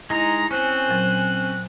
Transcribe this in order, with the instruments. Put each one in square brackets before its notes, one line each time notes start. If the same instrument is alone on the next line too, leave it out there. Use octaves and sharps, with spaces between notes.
[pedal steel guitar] G#3 D#4 [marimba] E4 [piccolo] A#5
[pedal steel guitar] C4 C#4 [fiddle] C5 G#5 [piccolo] F#6
[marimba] A#2 F#3